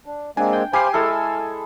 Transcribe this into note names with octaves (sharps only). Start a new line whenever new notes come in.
D4
G#3 A#3 C4 D4 G#5
G5
G4 C5 F5 G#5 B5 D6 C7
G#3 E4 A4 E6 F6